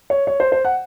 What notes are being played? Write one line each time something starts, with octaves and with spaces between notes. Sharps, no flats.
C#5
C#5
C5
C5
F#5